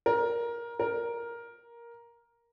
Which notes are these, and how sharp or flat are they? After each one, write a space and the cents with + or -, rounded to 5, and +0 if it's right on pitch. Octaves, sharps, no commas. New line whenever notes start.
A#4 +15
A#4 +10